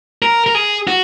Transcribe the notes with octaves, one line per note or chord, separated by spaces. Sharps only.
A#4
A#4
G#4
F#4